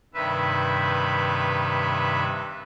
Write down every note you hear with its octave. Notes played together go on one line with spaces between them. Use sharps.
G2 C3 D#3 B4 E5